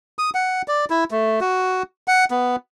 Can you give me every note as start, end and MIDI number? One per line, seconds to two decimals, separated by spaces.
0.19 0.30 87
0.35 0.62 78
0.68 0.85 74
0.90 1.04 64
1.11 1.40 57
1.41 1.83 66
2.08 2.25 78
2.31 2.56 59